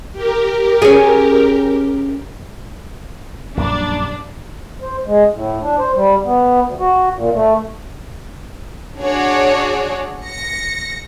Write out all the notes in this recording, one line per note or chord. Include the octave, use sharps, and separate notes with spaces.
G4 A#4
C#4 G#4
A#1 F#2 G3 D4
C5
G#3
A2
D4
C5
G3
B3
D2
F#4
A#2
A3
D4 F#4 G#4 C#5 D5
A#6 C#7